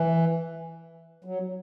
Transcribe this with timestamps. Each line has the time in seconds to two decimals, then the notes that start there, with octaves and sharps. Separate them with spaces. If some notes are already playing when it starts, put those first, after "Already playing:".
Already playing: E3
1.24 F#3